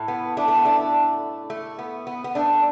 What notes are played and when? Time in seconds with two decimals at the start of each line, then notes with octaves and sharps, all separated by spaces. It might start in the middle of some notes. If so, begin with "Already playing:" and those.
Already playing: A2 A3
0.08 B3
0.37 A3 D4
0.48 A3
0.57 B3
0.65 A3 D4
1.50 A3
1.79 B3
2.07 B3
2.24 B3
2.35 A3 D4